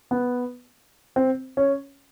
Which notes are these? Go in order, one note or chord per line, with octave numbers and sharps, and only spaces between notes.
B3
C4
C#4